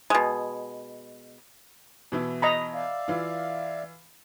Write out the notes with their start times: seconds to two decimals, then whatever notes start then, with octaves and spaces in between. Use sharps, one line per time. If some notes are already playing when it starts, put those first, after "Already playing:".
0.10 B2 G#3
2.12 B2 E3 E4
2.42 D#5 A#5 B5
2.74 D5 E5 F5
3.08 E3 F4